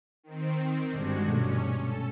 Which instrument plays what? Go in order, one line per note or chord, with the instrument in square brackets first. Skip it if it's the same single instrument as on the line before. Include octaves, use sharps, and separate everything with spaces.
[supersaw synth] D#3 C4
[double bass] G1 D4 [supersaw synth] G#3 F#4
[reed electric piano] B2 A3 [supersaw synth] C#4
[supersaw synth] A4